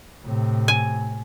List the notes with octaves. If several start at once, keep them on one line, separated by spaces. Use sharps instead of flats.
A2 C3
G#5